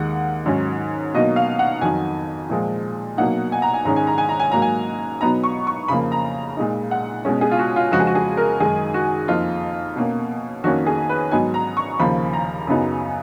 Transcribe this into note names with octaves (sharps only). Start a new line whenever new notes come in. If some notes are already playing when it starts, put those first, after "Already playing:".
Already playing: D#2 D#3 G#3 D#4 F#5
G#2 D#3 F#3 C#4
B2 F#3 A#3 D#4 D#5
F5
F#5
F2 D#3 F#3 G#5
A#2 F3 G#3
B2 F#3 A#3 D#4 F#5
G#5
A#5
G#5
G#2 D#3 G#3 C#4 A#5
G#5
A#5
G#5
A#5
G#5
G#2 F#3 A#3 A#5
G#5
B2 F#3 B3 D#4 A#5
C#6
C#6
F2 C#3 F3 A#3 B5
A#5
A#2 G#3 D#4
F#5
B2 G#3 C#4
G#4
F4
F#4
F4
F2 C#3 F3 G#3 F#4
G#4
F#4
G#4
A#4
F#2 D#3 G#3 D#4 G#4
F#4
F2 F3 A#3 D#4 F4
B2 A#3 C#4
F2 D#3 A#3 C#4 F#4
G#4
B4
G#2 F#3 B3 D#4 G#5
A#5
C#6
D#2 C#3 F3 A#3 B5
A#5
F#2 C#3 F#3 B3 D#4